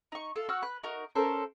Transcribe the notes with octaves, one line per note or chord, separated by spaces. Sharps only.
D#4 C#6
F4 A4
F#4 F#5 E6 F6
B4 F#6
D#4 F#4 A#4
C#4 A4 A#4 C5